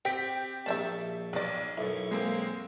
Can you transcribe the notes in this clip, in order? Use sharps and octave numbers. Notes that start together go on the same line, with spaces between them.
C4 G4 G5 B6 D7
A#1 A#3 D#5 E5 A5
B1 B4 D5
B1 F#2 E4
G#3 A#3 C4